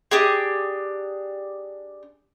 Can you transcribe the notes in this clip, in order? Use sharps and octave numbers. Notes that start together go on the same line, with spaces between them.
D4 G4 G#4